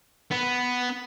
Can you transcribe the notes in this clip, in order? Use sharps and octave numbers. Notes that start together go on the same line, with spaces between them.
B3